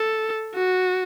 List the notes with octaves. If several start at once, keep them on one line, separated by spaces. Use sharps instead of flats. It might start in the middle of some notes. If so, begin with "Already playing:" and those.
Already playing: A4
F#4